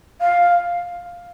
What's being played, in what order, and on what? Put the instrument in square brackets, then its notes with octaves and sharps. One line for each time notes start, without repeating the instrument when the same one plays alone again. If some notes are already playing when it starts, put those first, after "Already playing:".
[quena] F5